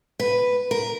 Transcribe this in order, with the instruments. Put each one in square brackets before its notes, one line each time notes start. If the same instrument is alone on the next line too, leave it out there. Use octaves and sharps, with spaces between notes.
[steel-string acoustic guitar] B4
A#4